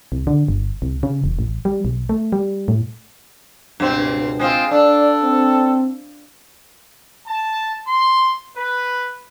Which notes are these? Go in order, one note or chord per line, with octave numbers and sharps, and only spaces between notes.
C2
D3
G1
C2
C#3
E1
A1
G3
B1
A3
G3
A2
C#2 G2 B2 C4
G#3 C4 F4 G#4
D4 A4 D5
C4
A5
C6
B4